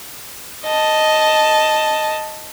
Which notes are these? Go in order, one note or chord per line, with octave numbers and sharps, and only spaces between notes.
D#5 A5